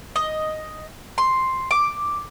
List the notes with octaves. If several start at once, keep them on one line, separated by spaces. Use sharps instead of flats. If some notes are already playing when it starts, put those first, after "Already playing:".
D#5
C6
D6